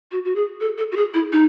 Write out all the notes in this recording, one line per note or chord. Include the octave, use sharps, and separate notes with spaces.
F#4
F#4
G#4
A4
A4
F#4
G#4
E4
D#4